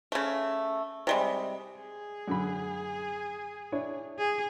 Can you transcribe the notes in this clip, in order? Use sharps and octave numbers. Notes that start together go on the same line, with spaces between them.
C#3 A3
C3 G3 G#3
G#4
F#2 D3 B5
D4 E4 C#5
G#4